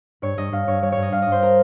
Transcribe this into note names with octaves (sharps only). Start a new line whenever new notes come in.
G2 C#5
G2 D#5
G2 F5
G2 C#5
G3 C#5
C#5
G2 D#5
G2 F5
G2 D#5
C5
A#4